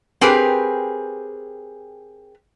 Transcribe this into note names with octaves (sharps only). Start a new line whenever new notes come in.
C4 G4 G#4 A#4 B4